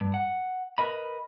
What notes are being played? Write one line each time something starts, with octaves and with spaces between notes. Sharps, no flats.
G2
F#5
A#4 B4 D#5 B5